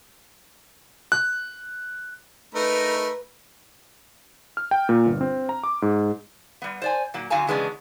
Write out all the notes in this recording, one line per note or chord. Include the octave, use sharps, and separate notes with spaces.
F#6
A3 D#4 A#4 B4
F6
G5
A#2
G1
C4
A#5
D6
G#2
G3 B3
C5 D5 G#5
A#2 F#3 A#3
F#2 D3 F#4 F5 G#5 A#5
C#3 E3 G#3 B3 C#4 D4